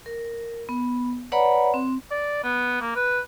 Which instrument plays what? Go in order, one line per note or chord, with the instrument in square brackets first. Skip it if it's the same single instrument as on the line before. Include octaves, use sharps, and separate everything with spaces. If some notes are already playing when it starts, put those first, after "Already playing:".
[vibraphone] A#4
B3
B4 C#5 D5 F#5 A#5 B5
C4
[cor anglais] D5
B3
A#3
B4